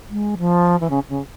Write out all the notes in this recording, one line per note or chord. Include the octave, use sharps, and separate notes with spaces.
G#3
F3
E3
C#3
C#3